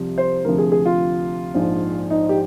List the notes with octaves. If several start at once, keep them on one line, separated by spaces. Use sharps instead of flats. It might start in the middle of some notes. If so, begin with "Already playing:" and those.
Already playing: C2 C3 F3
C5
D2 C3 F3 A#4
G#4
G#4
F4
A#1 G#2 F3
D#4
G4